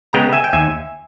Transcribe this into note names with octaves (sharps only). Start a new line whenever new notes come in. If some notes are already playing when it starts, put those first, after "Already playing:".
C#3 G#3 B3 G5 A#5
E5 G#5
G5
D#2 E5 G#5